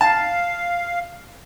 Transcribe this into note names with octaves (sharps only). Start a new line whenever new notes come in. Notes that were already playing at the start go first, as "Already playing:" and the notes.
F5 A5